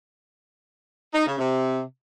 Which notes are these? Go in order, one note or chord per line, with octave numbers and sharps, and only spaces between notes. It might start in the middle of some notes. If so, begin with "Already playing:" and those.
D#4
C#3
C3